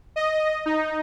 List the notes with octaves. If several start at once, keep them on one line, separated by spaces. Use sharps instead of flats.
D#5
D#4